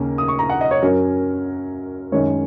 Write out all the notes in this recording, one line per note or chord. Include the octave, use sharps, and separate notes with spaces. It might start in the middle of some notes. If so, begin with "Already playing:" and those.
Already playing: D#2 C#3 A#3 C#4
D#6
C#6
A#5
F#5
D#5
C#5
F#2 F#3 C#4 A#4
F#2 D#3 G#3 C#4 C#5